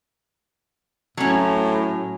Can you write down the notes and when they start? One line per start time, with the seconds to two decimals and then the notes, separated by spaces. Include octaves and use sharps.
1.17 A2 F#3 C#4